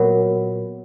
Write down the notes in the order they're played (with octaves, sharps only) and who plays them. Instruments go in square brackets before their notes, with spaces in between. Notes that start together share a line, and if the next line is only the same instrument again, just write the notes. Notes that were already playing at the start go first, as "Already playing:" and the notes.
Already playing: [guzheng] A#2 F#3 B3